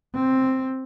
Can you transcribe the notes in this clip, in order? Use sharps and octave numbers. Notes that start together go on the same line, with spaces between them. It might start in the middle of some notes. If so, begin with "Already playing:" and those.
C4